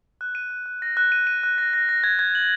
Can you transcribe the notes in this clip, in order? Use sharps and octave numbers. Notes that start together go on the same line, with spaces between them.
F#6
D#7
F#6
F#6
A#6
F#6
D#7
D#7
F#6
A#6
A#6
A#6
G#6
G#6
F#7